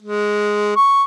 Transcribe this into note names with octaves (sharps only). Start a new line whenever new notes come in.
G#3
C#6